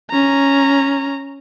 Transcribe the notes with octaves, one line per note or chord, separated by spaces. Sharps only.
C#4 A#5